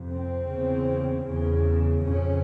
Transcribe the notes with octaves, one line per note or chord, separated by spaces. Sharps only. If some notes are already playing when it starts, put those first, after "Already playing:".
Already playing: F2 C3
C4
E2 C#3
E2 C#3
F2 C#3 C#4